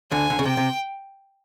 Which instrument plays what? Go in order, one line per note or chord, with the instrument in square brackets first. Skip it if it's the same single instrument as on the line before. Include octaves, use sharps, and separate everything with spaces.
[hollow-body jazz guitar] D2 D3 [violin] G#5
[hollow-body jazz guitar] D3
C#3
[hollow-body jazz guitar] C3 [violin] G5
[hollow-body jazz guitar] C3